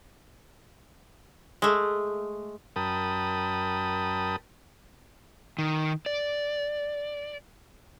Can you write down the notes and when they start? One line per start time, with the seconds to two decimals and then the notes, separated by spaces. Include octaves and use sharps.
1.62 G#3 A3
2.76 F#2 A#4 G5 A5 B5 D#6
5.58 D#3
6.06 D5